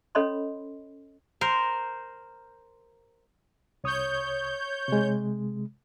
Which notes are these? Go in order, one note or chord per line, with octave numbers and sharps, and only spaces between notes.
C#4 A4 C#5 D#5 B5 C6
A#4 C5
C2 C#5 D#6 G6
C3 G#3